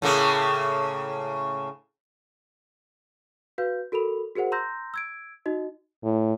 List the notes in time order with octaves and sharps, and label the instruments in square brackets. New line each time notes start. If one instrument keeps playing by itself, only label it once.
[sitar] A2 C#3 A#3
[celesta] F#4 B4 F5 G6
F#4 A4 A#4 B5 F7
F#4 G#4 A#4 C5 F#5
A#5 C6 E6 G6 A#6
E6 G#6 D7
D#4 F#4 D#5
[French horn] A2